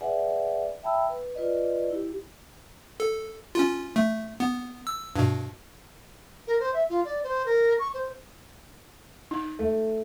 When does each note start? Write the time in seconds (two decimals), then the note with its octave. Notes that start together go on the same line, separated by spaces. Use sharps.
0.01 G#4 B4 D5 E5 F#5 G#5
0.83 E5 G5 A5 B5 E6
1.10 B4
1.35 F4 B4 D5 D#5
1.90 E4 G4
3.00 A4
3.55 C#4 F4
3.96 A3
4.40 B3
4.87 E6
5.16 G2 B2
6.47 A#4
6.60 C5
6.74 E5
6.90 F4
7.05 D5
7.24 C5
7.46 A#4
7.79 C#6
7.94 C5
9.31 D#4
9.59 A3